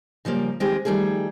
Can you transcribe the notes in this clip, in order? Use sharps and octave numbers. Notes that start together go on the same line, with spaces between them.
C#3 F3 G3 A#3
D#2 D#3 G#3 C4 G4 G#4
D#3 F3 G3 A3 G#4